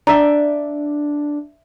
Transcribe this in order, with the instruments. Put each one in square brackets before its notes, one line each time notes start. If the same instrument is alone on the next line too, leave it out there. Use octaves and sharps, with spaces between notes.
[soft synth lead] D4 [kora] D5 E5 G5 [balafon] A#5